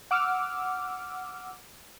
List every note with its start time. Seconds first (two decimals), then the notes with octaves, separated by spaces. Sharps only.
0.11 F#5 D6 E6 F6